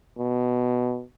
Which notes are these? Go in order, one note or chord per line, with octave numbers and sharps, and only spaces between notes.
B2